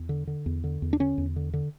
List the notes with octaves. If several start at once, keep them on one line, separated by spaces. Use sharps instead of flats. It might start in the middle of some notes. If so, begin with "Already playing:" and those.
Already playing: E2
D3
D3
E2
D3
E2
D4
D3 C#4
E2
D3
D3